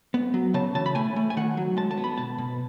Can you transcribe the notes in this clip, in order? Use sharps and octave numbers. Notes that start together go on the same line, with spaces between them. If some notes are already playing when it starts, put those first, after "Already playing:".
B3
F#3
C#3 A5
E3 A5
B5
A3 G#5
A3
G#5
D#3 F#5
F#3
G#3 A5
A5
B3
B5
B2 A5
B2